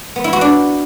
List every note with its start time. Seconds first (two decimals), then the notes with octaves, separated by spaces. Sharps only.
0.16 B3
0.24 E4
0.33 F#4
0.41 D4